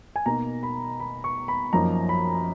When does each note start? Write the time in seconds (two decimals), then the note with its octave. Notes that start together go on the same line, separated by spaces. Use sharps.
0.16 G#5
0.26 B2 A#3 D#4 A#5
0.63 B5
1.00 B5
1.24 C#6
1.48 B5
1.73 F#2 F3 A#3 D#4 A#5
2.09 B5